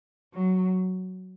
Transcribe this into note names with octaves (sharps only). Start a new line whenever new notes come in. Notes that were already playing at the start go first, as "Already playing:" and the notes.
F#3